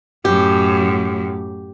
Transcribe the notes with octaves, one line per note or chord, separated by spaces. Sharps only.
F#2 A2 G4